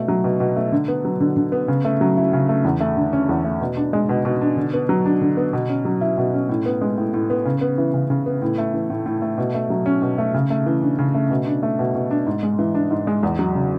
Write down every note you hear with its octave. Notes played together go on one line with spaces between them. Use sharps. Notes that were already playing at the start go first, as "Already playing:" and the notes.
Already playing: B2 A3
F#3
B2
B2
A3
D3
B3
F#3
D3
D3
B3
C#3
A3
F#3
E4
C#3
A3
E2
A3
D3
C#4
E2
A3
B2
D4
G#3
B2
B2
D4
D3
B3
F#3
D4
D3
B3
B2
C#4
F#3
E4
B2
C#4
A2
B3
G#3
A2
A2
B3
C#3
B3
E3
C#3
C#3
B3
A2
A3
E3
A2
A2
A3
B2
A3
F#3
C#4
B2
A3
C#3
A3
E3
D4
C#3
A3
B2
D4
A3
B2
B2
D4
G#2
G#3
E3
D4
G#2
G#3
E2
F#3
C#3